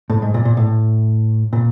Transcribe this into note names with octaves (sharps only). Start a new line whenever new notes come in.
A2
G#2
A#2
A#2
A2
A#2